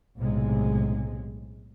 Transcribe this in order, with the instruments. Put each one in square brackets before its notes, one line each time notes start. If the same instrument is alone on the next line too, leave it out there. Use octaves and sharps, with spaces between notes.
[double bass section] B1 A2 C3 G#3